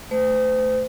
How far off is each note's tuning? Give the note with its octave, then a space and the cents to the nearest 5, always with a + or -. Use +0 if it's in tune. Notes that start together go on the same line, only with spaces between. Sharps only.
A3 +0 C5 -35